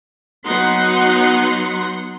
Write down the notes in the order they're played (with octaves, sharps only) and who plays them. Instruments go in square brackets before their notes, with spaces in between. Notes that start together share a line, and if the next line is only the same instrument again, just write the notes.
[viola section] F#3 B3 D#4 F#5 C6